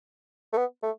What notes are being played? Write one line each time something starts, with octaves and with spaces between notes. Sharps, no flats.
A3
B3
A3